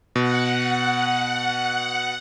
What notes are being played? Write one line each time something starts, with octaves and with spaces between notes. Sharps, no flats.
B2 F#5